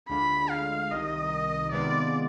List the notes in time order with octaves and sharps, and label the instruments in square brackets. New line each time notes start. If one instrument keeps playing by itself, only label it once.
[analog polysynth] D2 D3 G#3 D4 F4 [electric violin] B5
[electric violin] F5
[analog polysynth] C2 C3 D#3 [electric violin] D#5
[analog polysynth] C3 D#3 G#3 B3 F4 [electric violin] D5